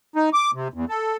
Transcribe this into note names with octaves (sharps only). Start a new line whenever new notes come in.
D#4
D6
C3
E2
A4